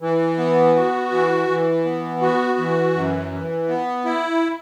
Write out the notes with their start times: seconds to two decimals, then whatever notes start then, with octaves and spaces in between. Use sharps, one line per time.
0.01 E3
0.38 B3
0.75 F#4
1.11 E3
1.48 E3
1.85 B3
2.21 F#4
2.58 E3
2.95 F#2
3.31 E3
3.68 B3
4.05 E4